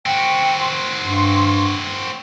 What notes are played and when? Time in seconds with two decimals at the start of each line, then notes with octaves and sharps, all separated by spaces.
0.06 C4 F#4 G5
0.61 C6
1.01 G2